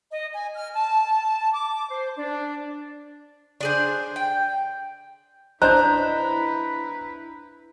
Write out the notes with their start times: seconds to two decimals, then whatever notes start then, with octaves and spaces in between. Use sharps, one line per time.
0.10 D#5
0.32 G#5
0.55 F6
0.75 A5
1.52 D6
1.89 C5
2.17 D4
3.61 D4 G#4 C5
4.16 G5
5.62 D4 E4 B4 C5 D#5 A#5 F#6 G6